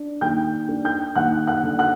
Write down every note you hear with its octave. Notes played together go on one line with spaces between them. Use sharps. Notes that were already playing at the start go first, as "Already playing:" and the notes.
Already playing: D4
D#2 G5 G6
D4
G5 G6
D#2 F#5 F#6
F#5 F#6
D3
F#5 F#6